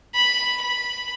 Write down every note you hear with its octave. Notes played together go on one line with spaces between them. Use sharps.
B5
B5